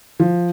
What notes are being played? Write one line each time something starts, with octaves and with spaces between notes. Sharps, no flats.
F3